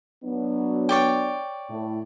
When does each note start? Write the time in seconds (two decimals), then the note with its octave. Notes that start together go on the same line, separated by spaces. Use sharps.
0.24 F#3 B3 D4
0.89 C#5 D5 G5
1.69 A2